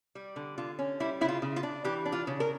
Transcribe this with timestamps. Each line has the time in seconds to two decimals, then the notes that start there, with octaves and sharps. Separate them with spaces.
0.15 G3
0.36 D3
0.58 D3 F4
0.79 C#4
1.00 G3 E4
1.21 C#3 E4
1.28 F4
1.42 C#3
1.56 F4
1.63 D4
1.84 E3 G4
2.05 D4
2.12 F4
2.27 C#3
2.40 A#4